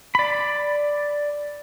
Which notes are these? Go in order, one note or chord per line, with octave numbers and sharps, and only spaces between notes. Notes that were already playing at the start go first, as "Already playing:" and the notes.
D5 B5